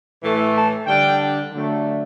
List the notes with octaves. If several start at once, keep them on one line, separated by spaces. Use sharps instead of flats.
A2 E3 A3
A5
D3 G3 D4 G5
D3 F#3 A3 D4